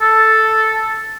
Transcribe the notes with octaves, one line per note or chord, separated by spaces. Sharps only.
A4